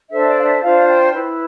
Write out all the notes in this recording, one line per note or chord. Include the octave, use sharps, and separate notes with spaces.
D4 A4 C5 E5
D5
F5
E5
D4 F4 C5 F5
G5
E4 B4